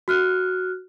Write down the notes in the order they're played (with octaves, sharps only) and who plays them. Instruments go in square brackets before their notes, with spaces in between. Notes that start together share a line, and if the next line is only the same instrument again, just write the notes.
[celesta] F#4 F6 F#6